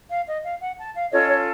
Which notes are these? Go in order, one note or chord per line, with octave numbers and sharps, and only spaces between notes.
F5
D#5
F5
F#5
A5
F5
C#4 F4 A4 C#5 D#5
C#5